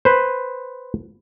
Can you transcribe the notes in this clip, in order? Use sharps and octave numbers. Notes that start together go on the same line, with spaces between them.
B4 C5